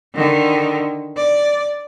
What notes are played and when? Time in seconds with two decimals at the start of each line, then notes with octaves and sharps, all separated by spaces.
0.14 D3 D#3
1.16 D5